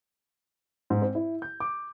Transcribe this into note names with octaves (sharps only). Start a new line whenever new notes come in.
G#2
C4
E4
G6
D6